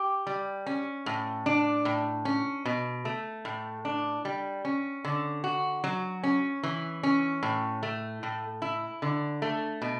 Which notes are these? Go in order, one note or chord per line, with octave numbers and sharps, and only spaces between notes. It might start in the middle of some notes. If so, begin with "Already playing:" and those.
Already playing: G4
G3
C#4
A2
D4
A2
C#4
B2
A3
A2
D4
G3
C#4
D3
F#4
F#3
C#4
E3
C#4
A2
A3
A2
E4
D3
A3
B2